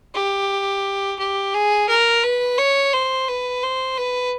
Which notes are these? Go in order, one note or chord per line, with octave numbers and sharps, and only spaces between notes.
G4
G4
G#4
A#4
B4
C#5
C5
B4
C5
B4